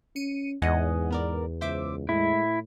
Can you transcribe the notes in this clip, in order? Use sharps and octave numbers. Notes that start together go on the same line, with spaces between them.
C#4 C#7 D#7
E2 G#2 D#5 F#5 G#5
B3 A#4 D5
C#2 C5 E5 D6
A2 G#3 E4